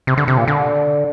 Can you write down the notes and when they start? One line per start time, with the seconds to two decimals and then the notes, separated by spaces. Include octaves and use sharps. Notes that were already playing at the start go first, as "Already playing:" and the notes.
0.07 C3
0.18 D3
0.28 C3
0.37 A#2
0.48 D3